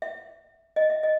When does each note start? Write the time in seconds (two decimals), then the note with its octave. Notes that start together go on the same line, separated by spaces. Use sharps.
0.02 E5
0.76 D#5
0.90 E5
1.03 D#5